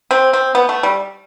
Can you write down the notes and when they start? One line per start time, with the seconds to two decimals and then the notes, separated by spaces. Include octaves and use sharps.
0.11 C4
0.33 C4
0.55 B3
0.69 A3
0.83 G3